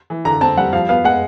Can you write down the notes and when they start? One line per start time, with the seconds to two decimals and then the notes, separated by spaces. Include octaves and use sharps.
0.10 E3
0.25 D3 A#5
0.41 C4 A5
0.57 G3 F#5
0.73 F3 F5
0.89 B3 F5
1.04 G#3 F#5